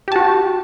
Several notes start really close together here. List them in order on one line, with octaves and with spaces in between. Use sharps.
G4 A5 F#4